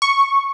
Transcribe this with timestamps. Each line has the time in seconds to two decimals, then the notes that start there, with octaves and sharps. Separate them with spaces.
0.02 C#6